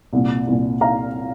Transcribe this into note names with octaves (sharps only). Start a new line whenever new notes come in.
C2 A#2
C2 A#2
F5 A#5